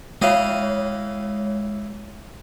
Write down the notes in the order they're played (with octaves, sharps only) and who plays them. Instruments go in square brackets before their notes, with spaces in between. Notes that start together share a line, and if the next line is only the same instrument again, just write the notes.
[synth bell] G#3 C#5 [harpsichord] E4 D#5 F5